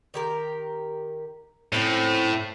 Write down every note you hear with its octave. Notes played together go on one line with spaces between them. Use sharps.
D#3 G4 A#4
A2 F3 C4 C#4